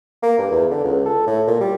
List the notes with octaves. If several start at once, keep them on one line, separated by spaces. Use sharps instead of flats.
A#3
G2
E2
D3
C#2
A4
A2
A#2
G3